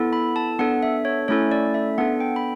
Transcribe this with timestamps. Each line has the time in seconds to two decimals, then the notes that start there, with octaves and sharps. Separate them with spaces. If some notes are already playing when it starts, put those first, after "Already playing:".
Already playing: B3 E4 A4
0.13 B5
0.36 A5
0.59 B3 D4 A4 F#5
0.83 E5
1.05 C#5
1.28 A3 C#4 E4 A4 C#5
1.51 D5
1.74 E5
1.98 B3 D4 A4 F#5
2.20 G5
2.36 B5